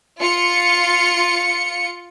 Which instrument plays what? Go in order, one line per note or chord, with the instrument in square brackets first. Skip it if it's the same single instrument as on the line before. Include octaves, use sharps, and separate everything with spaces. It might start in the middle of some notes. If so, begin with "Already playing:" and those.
[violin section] F4 C#7